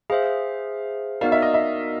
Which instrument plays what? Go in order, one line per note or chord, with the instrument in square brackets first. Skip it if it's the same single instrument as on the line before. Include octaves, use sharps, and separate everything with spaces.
[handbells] G#4 C5 E5 [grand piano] F5
[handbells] B3 D#4 F#4 A#4 D5 [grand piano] F5
[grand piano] E5
D#5
E5